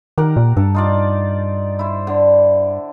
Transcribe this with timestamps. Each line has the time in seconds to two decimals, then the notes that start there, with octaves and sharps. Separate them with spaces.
0.18 D#3 G4 A#4 F#5
0.37 A#2
0.57 G2 A4
0.75 D#4 F4 D5
1.79 E4 C5
2.07 D3